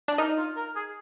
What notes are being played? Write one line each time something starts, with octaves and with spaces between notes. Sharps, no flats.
D4
D#4 A#4
F4
A#4
G#4